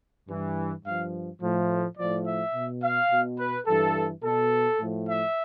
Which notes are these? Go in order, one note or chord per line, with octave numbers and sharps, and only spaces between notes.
G2 E3
G2 F3 F5
A2 F3
A2 F3 D5
E5
B2
F5
B2
B4
G2 E3 A4
B2 A4
A2 F3
E5